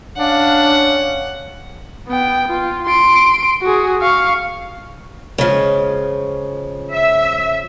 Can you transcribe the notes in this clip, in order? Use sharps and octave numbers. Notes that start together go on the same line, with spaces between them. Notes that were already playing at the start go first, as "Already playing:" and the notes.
C#4 D4 F5 F#5
B3 G5
F4
C6 D7
F#4 G#4
F5 C#6
C#3 F3 G#3
E5